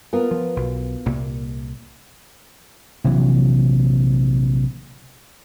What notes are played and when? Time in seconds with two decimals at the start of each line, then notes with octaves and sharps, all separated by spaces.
0.13 B3 F4 A#4
0.31 F3
0.56 B1
1.06 C2 A#2 A#3
3.04 A#1 C3 E3 F#3